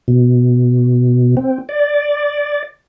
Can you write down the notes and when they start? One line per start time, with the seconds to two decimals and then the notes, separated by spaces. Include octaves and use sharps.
0.08 B2
1.37 C4
1.69 D5